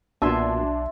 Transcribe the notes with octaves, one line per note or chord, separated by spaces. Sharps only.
B1 A#2 B3 D4 F#4 E5 G#5 C6